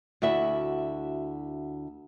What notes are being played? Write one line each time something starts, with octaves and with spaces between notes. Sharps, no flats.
D2 E4 F#4 E5